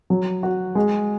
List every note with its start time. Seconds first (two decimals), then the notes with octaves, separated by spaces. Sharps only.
0.10 F#3
0.43 F#4
0.75 G#3